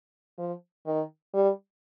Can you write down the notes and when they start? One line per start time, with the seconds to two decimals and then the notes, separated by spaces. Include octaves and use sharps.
0.38 F3
0.86 D#3
1.34 G3